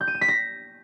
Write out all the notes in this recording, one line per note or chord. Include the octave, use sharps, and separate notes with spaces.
G6
D#7
E7
B6
A#6